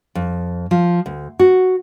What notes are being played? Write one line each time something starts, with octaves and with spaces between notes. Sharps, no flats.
F2
F3
D2
F#4